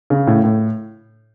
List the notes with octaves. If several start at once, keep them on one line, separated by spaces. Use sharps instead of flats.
C#3
A2
A2